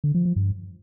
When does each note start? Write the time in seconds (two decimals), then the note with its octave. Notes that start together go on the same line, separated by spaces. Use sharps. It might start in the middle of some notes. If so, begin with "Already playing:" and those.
0.04 D3
0.14 F3
0.25 F3
0.36 G2